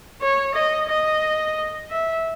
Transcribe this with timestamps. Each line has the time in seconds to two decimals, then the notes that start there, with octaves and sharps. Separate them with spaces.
0.22 C#5
0.55 D#5
0.89 D#5
1.90 E5